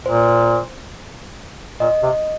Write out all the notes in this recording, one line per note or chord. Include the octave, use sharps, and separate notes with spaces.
A#2 C5
A#2 D#5
C3